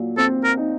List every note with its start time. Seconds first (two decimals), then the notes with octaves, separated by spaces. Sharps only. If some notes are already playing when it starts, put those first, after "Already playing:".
Already playing: A#2 F#3
0.18 C4 A4
0.44 A#4
0.57 D#4